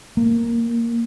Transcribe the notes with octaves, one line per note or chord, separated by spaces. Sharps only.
A#3